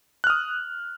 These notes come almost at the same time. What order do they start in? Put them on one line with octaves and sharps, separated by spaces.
F#6 F6 D#6